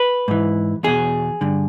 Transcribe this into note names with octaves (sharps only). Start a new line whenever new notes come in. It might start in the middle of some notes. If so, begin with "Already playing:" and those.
Already playing: B4
G#2 E3
E2 B2 G#4
G2 D3